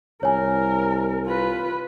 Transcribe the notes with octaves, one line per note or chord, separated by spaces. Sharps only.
C2 A#4 C#5 G#5
F4 B4